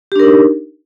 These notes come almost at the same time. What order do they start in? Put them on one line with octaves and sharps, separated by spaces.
G4 D4 A#4 D#4